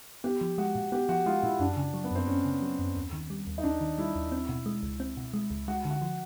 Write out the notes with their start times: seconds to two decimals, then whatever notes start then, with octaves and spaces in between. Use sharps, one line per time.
0.24 B3 G4
0.41 F3
0.58 G#3 F#4
0.75 A#2
0.92 B3 G4
1.09 F3 F#4
1.26 G#3 F4
1.43 A#2 E4
1.60 F#2 D4
1.77 C#3
1.94 F#3
2.04 B3
2.11 F#2 C4
2.27 F#2 C#4
2.45 C#3
2.62 F#3
2.79 F#2
2.96 D#2
3.13 D#3
3.30 G3
3.47 D#2
3.58 D#4
3.63 D#2 D4
3.81 D#3
3.98 G3 E4
4.15 D#2
4.32 C4
4.49 B2
4.66 G#3
4.83 C#2
5.00 C4
5.17 B2
5.34 G#3
5.51 C#2
5.68 G#3 F#4
5.85 D3
5.90 F#4
6.02 F3